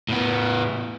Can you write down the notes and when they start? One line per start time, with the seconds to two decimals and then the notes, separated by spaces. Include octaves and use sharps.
0.09 A2 B3